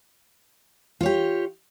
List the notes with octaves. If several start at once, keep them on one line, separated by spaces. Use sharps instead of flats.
F4 G4 C#5